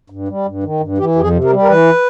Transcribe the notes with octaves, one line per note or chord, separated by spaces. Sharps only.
G2
G3
G2
D#3
G2
E3 G4
F2 G4
G#4
C3
A#4
G3
A#4
E3 B4